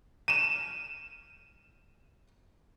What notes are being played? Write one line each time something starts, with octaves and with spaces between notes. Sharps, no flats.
D#7 E7